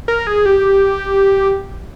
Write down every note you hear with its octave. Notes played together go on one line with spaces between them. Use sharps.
A#4
G#4
G4